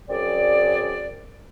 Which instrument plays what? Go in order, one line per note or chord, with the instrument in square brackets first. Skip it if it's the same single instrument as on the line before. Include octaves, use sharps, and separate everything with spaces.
[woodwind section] F#2 C4 G#4 D5